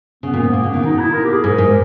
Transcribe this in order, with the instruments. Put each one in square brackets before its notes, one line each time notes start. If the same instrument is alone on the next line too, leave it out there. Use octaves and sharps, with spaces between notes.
[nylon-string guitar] C#3 [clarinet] B3
[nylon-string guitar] A#2
G#2
[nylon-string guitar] A#2 [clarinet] A#3
[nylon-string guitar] C#3 [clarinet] A#3
[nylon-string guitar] D#3 [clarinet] B3
[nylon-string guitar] B2 [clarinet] D#4
[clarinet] E4
A#4
G4
G#4
[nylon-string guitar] G#2 [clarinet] A#4
[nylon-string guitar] G#2